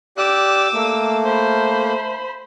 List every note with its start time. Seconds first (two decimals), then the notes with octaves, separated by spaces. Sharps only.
0.17 G4 D5 D6 E6 F#6
0.73 A3 A#3
1.25 C5 B5